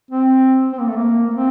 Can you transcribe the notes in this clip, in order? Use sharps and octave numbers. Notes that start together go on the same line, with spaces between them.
C4
C4
A#3
A3
A#3
C4